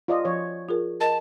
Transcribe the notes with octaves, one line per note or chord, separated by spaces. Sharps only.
F4 D5 D#5
F3 C#5
F4 G#4 A#4
A#4 D#5 A5